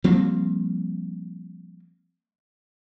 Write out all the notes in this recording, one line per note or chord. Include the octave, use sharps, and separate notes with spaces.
F3 G3 A#3 C4